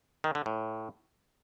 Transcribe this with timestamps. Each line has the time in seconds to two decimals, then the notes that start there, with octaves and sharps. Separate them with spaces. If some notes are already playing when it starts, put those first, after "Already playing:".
0.24 D#3
0.35 D3
0.46 A2